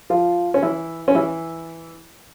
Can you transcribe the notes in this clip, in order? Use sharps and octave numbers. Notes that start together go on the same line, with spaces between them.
F3 F4
C#4
E3 E4
C#4
E3 E4